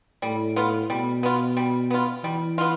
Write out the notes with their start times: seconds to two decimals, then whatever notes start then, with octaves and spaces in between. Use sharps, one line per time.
0.22 A2 G3
0.56 B3 F4
0.90 B2 G3
1.23 B3 F4
1.57 G3
1.91 B3 F4
2.24 E3 G3
2.58 B3 F4